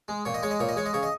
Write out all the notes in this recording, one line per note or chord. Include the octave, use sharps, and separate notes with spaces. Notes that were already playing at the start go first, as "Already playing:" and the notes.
G#3
A#2 C#5
D#5
G#3 C#5
D#5
A#2 C#5
D#5
G#3 C#5
D#5
C#3 C#5
D#5